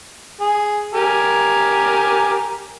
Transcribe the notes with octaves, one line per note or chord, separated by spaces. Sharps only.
G#4
G4 A#4 G#5